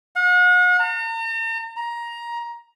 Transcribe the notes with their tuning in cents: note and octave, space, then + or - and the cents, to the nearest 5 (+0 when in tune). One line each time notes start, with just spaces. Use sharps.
F#5 -40
A#5 -45
A#5 +15